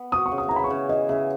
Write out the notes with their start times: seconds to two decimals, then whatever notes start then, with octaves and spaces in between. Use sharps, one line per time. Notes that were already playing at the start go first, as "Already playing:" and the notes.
Already playing: B3
0.12 F#4 D#6
0.26 C#6
0.32 C#3
0.38 D#6
0.48 E3 A#5
0.56 B5
0.64 C#6
0.70 C#3
0.89 E3 D#5
1.09 C#3 E5